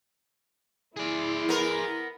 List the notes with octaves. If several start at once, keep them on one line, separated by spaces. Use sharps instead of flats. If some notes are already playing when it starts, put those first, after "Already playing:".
E4 G#4 D5 C6
B3 A#4